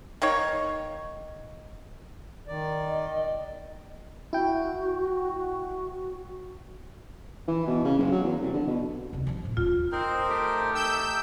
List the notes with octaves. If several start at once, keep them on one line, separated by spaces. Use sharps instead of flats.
D#3 A#3 D#4 C#5
D#3 D5
D#5
E4 F#4 G5
E3
B2
C#3
F#1
F#3
E2
C2
D3
B2
F1 D#2
E3 F3
A2
D#1 F4
C4 D#4 A#4 C5
A3 G4
D#4 G5 E6 G6